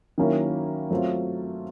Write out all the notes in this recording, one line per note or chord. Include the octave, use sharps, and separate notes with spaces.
D#3 F#3 A#3 C#4 E4
F#3 A3 C4 F4